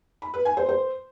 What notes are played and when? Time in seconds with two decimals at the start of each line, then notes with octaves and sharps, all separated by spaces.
0.22 B5
0.34 B4
0.45 G#5
0.57 C5
0.69 C5